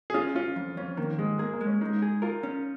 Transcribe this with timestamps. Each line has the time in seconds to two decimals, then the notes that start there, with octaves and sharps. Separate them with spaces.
0.10 G#4
0.14 C#4 F4
0.35 C#4 F4
0.56 F2
0.77 F2 C#4
0.97 D#3 A#3
1.19 G#2 G#3
1.39 A#3 G#4
1.53 A#3
1.61 G#3
1.67 C#4
1.81 G#3 D#4
2.02 G#4
2.22 F4 A#4
2.43 C#4